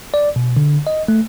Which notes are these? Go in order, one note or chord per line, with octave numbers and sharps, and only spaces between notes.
D5
B2
D3
D#5
A3